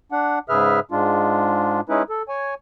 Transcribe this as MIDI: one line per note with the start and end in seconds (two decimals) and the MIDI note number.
0.12 0.39 62
0.12 0.39 78
0.49 0.80 44
0.49 0.80 49
0.49 0.80 68
0.49 0.80 71
0.49 0.80 76
0.49 0.80 89
0.91 1.81 44
0.91 1.81 56
0.91 1.81 62
0.91 1.81 65
1.89 2.03 56
1.89 2.03 61
1.89 2.03 63
1.89 2.03 64
1.89 2.03 71
2.10 2.22 69
2.28 2.54 73
2.28 2.54 80